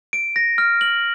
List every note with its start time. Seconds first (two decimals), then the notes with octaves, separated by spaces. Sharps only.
0.13 D7
0.36 A#6
0.58 F6
0.81 F#7